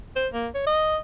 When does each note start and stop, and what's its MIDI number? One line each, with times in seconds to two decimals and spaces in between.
0.16 0.28 72
0.33 0.48 58
0.55 0.66 73
0.67 0.98 75